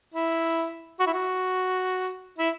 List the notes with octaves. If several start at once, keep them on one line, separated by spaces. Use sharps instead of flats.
E4
F#4
E4
F#4
E4